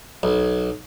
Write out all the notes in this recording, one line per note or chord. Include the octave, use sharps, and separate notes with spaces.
B1